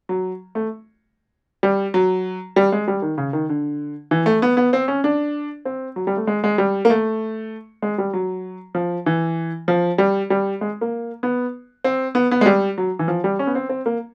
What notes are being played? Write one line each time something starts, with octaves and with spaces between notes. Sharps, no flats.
F#3
A3
G3
F#3
G3
G#3
G3
D#3
C#3
D#3
D3
E3
A3
B3
B3
C4
C#4
D4
C4
F#3
G3
A3
G#3
G#3
G3
A#3
A3
G#3
G3
F#3
F3
E3
F3
G3
G3
G#3
A#3
B3
C4
B3
B3
G#3
G3
F#3
E3
F3
G3
C#4
B3
C4
C4
A#3